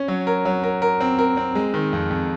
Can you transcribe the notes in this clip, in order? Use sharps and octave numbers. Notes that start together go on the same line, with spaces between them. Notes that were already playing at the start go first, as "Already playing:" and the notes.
Already playing: C#4
F#3
A#4
F#3
A#4
A#4
C4
A#4
C4
G#3
D#3
F2
F2